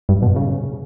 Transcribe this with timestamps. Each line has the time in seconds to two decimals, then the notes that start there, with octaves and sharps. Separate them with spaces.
0.09 G2
0.22 B2
0.36 C#3